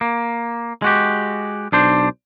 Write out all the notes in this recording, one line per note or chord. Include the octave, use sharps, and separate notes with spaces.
A#3
G#3 F#4 G4
B1 D4 C5